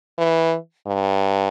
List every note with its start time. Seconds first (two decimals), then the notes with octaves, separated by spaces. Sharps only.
0.18 E3
0.88 G2